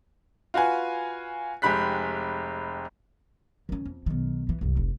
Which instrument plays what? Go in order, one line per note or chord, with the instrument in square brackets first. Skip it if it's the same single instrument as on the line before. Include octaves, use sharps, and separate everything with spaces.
[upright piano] F4 F#4 B4 G#5
F1 G#3 G4 B5 F#6 B6
[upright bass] D#3 C#4
F2
B1 D#3
E3
C2 F#2
F1